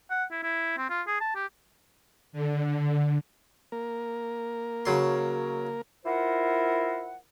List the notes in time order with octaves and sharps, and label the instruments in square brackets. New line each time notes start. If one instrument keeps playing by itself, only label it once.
[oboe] F#5
E4
E4
C4
F4
G#4
A5
G4
[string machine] D3
[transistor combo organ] A#3 A#4
[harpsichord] C#3 F#3 C6
[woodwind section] E4 F4 A#4 C5 F#5